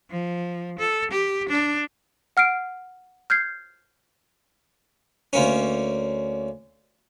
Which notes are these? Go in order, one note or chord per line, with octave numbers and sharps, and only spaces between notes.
F3
A4
G4
D4
F#5 F6 C7 D7
F6 G6 G#6 C7
D2 A#3 C#4